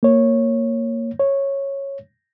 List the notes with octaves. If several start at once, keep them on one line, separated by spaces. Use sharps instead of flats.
A#3 C#5
C#5